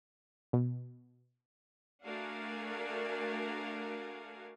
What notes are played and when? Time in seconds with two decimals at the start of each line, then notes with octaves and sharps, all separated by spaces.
0.53 B2
2.04 A3 D4 F#4 A#4 F5 G#5